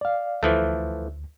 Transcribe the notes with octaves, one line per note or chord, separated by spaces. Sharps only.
D5 F5
D2 E3 F3 A3